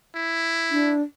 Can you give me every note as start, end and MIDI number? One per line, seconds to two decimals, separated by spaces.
0.16 0.93 64
0.71 1.01 62